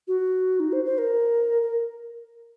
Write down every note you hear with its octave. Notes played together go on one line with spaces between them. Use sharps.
F#4
D#4
C5
C5
A#4
A#4